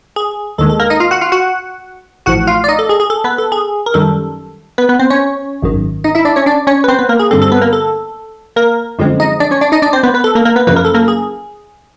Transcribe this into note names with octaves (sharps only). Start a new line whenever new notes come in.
G#4
D#2 D#3 G#3 A4
A4
A#3 A#4
D#4 D#5
F4 F5
F#4 F#5
F4 F5
F#4 F#5
A1 A2 F3 F#4 F#5
F4 F5
D5
D#4 D#5
A4
G#4
G#4
A4
B3 B4
A4
G#4
A#4
F#2 D#3 G3 A4
B3 B4
B3 B4
C4 C5
C#4 C#5
G#1 F#2 D#3
D#4 D#5
E4 E5
D4 D5
C#4 C#5
D4 D5
C#4 C#5
B4
C4 C5
B3 B4
A#3 A#4
G#4
G2 D3 G3 C4 A4
A4
B3 B4
A#3 A#4
A4
A#3 A#4
F#2 D3 F3 G#3 C4
D#4 D#5
D4 D5
C#4 C#5
D4 D5
D#4 D#5
D4 D5
C4 C5
B3 B4
B3 B4
A4
A#3 A#4
A#3 A#4
B3 B4
F#2 C#3 F3 A#3 B4
A#4
A4
A#3 A#4
G#4